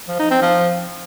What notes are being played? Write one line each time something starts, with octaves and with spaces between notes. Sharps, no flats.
F3
D#4
C4
F3